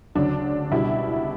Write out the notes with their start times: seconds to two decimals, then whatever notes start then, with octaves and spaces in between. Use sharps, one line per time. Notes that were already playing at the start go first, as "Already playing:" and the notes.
0.15 D2 C#3 F#3 D4
0.71 C#2 B2 G3 E4